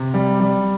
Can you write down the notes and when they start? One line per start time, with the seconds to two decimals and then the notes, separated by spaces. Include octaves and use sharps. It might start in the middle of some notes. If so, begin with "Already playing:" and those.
Already playing: C3
0.14 G3
0.40 G3